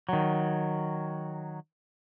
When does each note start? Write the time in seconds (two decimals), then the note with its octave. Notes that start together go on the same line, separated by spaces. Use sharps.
0.09 D#3 F#3